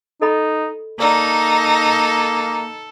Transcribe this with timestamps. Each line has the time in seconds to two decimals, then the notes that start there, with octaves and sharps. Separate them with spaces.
0.22 D#4 A4 D#5 B5
1.00 A#3 D#4 A4 D5 E6